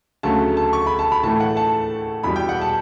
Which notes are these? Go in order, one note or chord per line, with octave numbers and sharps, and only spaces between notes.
D2 C#3 F#3 A3 A5
A5
C#6
B5
A5
B5
A2 E3 A3 A5
F#5
A5
E2 B2 G3 B5
G5
F#5
A5